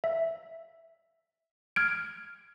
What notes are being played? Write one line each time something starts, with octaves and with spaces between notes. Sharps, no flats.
E5
F6 G#6 D7